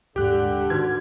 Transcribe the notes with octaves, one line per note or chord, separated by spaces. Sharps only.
D#1 G#2 D3 G4 F#6
D#3 D#4 F#4 B4 G#6